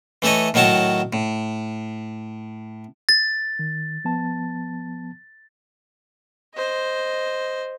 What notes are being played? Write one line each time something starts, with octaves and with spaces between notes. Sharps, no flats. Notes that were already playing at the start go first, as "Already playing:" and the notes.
E3 A3 A4 C#5 D#5
A2 D#3 F#3 C#5 A5 A#5
A2
A6
D#3
F3 B3 A5
C5 D#5